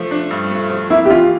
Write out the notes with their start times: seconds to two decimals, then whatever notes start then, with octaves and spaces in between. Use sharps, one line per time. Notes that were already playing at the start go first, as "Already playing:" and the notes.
Already playing: F3 A3
0.11 D4
0.31 G2
0.51 A3
0.70 F3
0.90 A#3 E4
1.05 G4
1.11 E3 F4